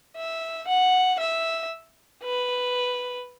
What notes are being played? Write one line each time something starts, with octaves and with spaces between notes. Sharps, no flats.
E5
F#5
E5
B4